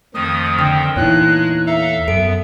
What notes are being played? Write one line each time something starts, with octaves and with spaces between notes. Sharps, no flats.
F2 D#3 F3 A3 D#6
D3 G5 E6
E2 A#2 G#3 D#4 E4 C#5 F#6
A4 E5 F5 A#5
F#2 B3 A4 D7